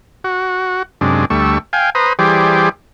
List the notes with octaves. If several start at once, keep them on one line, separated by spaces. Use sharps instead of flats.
F#4
F#2 C3 G#3 D4
D2 G3 A3 C#6 E6
F5 G5 G#5
B4 C5 A#5 D#6
E3 G3 G4 G#4 C5 D5